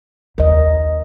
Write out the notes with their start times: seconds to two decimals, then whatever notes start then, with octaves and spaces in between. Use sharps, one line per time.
0.38 D#2 D#3 A#4 D#5